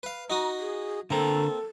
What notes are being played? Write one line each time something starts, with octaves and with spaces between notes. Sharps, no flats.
B4 F5
D#4 F#4 A#5 D#6
G#4
D3 A#3 C4 A4 A#5